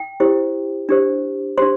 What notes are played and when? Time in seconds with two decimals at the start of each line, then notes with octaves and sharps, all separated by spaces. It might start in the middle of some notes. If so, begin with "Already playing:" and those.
Already playing: G5
0.20 E4 G4 C5
0.89 D4 G4 C5
1.57 D4 G4 C5 C6